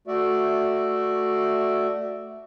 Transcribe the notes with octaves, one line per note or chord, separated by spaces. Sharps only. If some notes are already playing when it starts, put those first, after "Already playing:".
A3 F#4 D5 E5